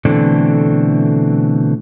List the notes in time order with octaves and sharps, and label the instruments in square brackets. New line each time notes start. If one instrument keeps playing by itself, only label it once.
[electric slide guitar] B2 D3 E3 A3 C4 D4